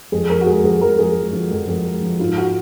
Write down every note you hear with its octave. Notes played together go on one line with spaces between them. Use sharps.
F2 G#4
F2 A#4
F#4
G#3 G#4
F3 G#4
F2 A#4
F2 G#4
G#3
F3
F2
F2
G#3
F3
G#2 F4
F#4